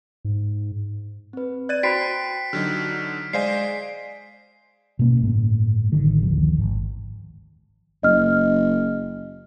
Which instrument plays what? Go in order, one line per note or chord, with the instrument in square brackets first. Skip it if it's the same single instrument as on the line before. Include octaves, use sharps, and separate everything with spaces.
[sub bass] G#2
[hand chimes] C4 B4
[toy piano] D5 [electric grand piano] F#6 A6 D#7
[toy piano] F#4 C5 B5 [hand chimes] G5 [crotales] B6 C7 D7
[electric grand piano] D3 F#3 D#4 [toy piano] G4 [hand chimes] F6
[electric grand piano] G#3 C5 D#5 [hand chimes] D5 F5 G#5 [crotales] C7
[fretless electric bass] B2 A#3 C#4
G1 A2
A1 D3 D#3
F#1 D2 D#3 F3
G#1
[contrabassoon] F#1 [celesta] D#5 F6